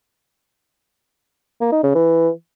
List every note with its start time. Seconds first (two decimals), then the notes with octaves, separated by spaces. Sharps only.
1.61 A#3
1.72 D#4
1.84 C#3
1.95 E3